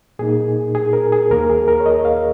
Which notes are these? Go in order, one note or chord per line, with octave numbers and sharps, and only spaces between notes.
A#2 A#3 D#4 G#4
G#4
A#4
G#4
D#2 D#3 A#3 A#4
G#4
A#4
C#5
D#5
F5